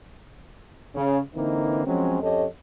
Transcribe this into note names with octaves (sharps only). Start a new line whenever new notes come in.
C#3
D3 E3 A#3 C4 D#4
F3 F#3 G#3 C4 C#4
F2 C#4 G4 A4 C#5 D#5